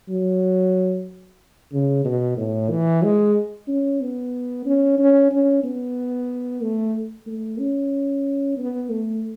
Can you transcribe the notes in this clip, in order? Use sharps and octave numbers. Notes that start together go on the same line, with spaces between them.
F#3
C#3
B2
A2
E3
G#3
C#4
B3
C#4
C#4
C#4
B3
A3
A3
C#4
B3
A3